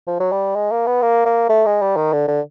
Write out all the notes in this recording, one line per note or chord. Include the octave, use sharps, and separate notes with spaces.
F3
F#3
G3
G#3
A#3
B3
A#3
A#3
A3
G#3
G3
D#3
D3
D3